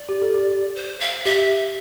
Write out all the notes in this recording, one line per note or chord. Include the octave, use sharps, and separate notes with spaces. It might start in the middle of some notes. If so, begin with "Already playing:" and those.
Already playing: D5
G4
A4
G4
C5
F5
G4 E5